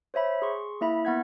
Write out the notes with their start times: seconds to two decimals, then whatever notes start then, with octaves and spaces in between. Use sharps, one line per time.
0.14 C5 C#5 E5 B5
0.42 G#4 C6 C#6
0.81 A#3 E4 E5 B5
1.05 B3 F#5 G#6